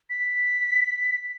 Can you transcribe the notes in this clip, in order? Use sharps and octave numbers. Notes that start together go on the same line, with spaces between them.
B6